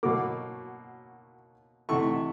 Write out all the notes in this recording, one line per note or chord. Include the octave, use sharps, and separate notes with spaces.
B2 F#3 A#3 D6
C3 E3 A3 C#6